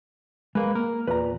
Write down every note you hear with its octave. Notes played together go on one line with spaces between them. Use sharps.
G#3 A#3 B4
A#3 A#4
E2 A#2 B4 A#5